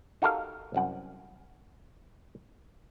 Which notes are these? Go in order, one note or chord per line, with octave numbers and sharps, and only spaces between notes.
D#4 F#4 G4 A4 A#4 F5
C2 F#2 F#5